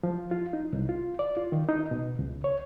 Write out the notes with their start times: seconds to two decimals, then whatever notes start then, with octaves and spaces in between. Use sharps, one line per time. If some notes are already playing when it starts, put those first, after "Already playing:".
0.03 F3
0.31 F4
0.53 D#4
0.73 C2
0.89 F4
1.19 D5
1.37 F4
1.52 D#3
1.69 D#4
1.91 B2
2.19 C#2
2.44 C#5